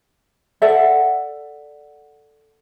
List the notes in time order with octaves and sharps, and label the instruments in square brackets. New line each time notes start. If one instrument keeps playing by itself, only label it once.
[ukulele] A4 D5 E5 F#5